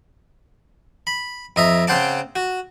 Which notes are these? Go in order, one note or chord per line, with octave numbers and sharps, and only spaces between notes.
B5
F2 D#5 E5 A#5
C#3 C4 C5 F#5 A5 D6
F#4